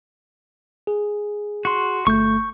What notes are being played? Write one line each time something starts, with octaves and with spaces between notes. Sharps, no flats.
G#4
F#4 C6
G1 A3 C#6 G6